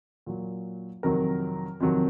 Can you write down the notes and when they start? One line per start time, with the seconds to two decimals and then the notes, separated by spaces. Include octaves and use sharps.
0.26 A#2 F#3
1.03 F2 C3 D#3 F#3 A#4
1.80 F2 C3 D#3 F#3